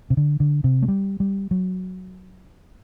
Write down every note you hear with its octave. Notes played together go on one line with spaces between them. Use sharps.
C3
D3
D3
C3
A3
G3
G3
F#3